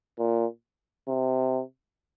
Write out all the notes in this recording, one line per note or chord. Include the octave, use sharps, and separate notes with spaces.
A#2
C3